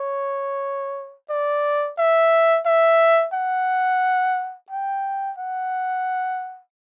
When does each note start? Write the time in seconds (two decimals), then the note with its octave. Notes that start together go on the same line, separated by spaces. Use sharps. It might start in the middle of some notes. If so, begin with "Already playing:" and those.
Already playing: C#5
1.30 D5
1.98 E5
2.66 E5
3.34 F#5
4.71 G5
5.38 F#5